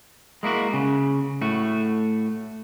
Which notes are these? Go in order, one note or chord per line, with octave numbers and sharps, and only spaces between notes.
G#3 A#3 E4 F#4
C#3
A2 A3 F#4